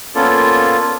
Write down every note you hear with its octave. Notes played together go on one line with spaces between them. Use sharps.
A#3 B3 C#4 F4 A4 D5